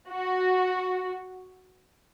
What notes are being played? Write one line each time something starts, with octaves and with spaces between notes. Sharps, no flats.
F#4